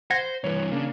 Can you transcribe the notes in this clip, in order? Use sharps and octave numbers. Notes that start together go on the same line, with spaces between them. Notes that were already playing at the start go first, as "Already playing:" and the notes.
C5 F#5 G#6 A#6
G2 E3 B4 C#5
C#3 A#3 D4